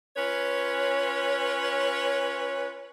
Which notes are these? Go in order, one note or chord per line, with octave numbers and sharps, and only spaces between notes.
C#4 F4 B4 C#5